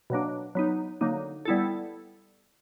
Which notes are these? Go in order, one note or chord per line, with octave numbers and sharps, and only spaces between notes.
B2 F#3 A#3 D4
F#3 B3 D#4
D3 F#3 A#3 D#4
G3 B3 E4 A4